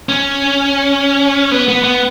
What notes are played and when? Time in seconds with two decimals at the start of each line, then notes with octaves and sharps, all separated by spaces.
0.09 C#4
1.51 B3
1.68 B3
1.84 B3